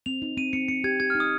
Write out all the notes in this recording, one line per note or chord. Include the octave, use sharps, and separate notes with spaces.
C4 F7
D#4
C4 D#7
C4 C#7
C4 C#7
G4 G#6
G4 G#6
D#4 F6
D#6